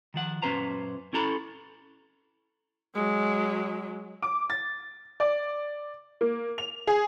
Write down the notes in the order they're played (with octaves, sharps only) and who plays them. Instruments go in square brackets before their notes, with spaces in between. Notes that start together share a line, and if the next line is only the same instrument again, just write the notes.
[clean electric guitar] D#3 F3 F#5
F#2 A#2 C#4 B4 C5 A#5
C#4 E4 A4 A#5 B5
[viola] F#3 G#3
[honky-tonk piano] D6
A6
D5
A#3
F7
G#4